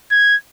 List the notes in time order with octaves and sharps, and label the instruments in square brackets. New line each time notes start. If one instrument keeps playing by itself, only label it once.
[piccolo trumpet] G#6